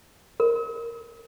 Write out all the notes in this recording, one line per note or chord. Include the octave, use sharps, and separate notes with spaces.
A#4